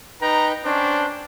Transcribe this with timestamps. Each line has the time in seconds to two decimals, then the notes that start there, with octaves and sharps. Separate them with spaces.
0.22 D#4 B4 G5 A#5
0.65 C#4 D4 C5 G5